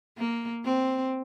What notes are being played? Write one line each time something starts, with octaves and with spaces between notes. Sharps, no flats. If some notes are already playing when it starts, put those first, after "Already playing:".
A#3
C4